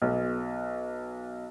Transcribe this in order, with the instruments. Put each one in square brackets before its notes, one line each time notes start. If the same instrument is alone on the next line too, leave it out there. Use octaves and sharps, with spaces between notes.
[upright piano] B1